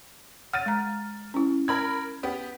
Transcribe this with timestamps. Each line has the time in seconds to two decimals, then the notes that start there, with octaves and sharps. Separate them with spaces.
0.53 F#5 F6 A6 D#7
0.66 G#3 A#5
1.34 C#4 E4
1.68 A#4 B5 G#6
2.23 B3 G4